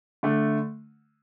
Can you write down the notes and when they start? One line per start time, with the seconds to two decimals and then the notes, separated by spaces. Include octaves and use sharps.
0.23 D3 A3